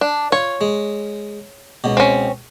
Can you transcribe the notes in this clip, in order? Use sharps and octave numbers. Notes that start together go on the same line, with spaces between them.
D4
F4 C#5
G#3
C#2 B2
C4 C#4